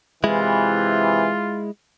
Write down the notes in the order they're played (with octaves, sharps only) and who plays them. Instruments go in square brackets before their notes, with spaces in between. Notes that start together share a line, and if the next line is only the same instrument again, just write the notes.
[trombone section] C3 E3 [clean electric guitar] G#3 E4 [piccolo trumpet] F4